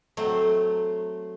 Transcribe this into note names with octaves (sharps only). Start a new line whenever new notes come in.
F#3 A3 C4